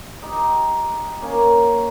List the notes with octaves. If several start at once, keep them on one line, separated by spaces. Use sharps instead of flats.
D#4 G4
A#3 C#4